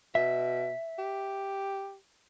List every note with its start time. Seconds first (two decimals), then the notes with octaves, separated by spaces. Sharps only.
0.15 B2 E5
0.98 G4